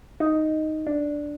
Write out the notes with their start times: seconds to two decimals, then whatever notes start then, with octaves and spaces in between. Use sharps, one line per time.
0.20 D#4
0.87 D4